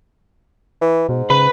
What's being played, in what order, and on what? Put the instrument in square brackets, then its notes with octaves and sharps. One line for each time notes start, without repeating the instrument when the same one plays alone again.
[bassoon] E3
[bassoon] G#2 [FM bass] B2
[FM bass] C#3 [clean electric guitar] B4 B5